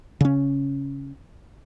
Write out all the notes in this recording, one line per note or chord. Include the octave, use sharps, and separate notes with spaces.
C#3 C#4